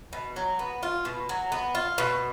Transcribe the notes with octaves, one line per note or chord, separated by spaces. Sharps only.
B2
F#3
B3
F4
B2
F#3
B3
F4
B2